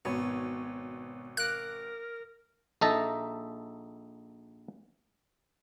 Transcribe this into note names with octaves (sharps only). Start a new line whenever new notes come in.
G#1 B2 B3 C#5
A#4 F5 D6 F#6
A#1 D#4 A4 E5 A5 A#5